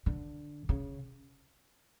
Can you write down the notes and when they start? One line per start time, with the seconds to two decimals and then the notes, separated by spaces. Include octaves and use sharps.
0.06 D3
0.69 C#3